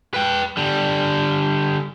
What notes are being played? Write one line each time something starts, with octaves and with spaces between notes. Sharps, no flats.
B4 G5
D3 G3